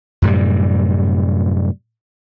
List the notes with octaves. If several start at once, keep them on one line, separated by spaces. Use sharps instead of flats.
F#2 A2 C3 G3